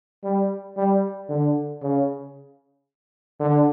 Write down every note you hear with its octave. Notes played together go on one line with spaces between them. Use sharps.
G3
G3
D3
C#3
D3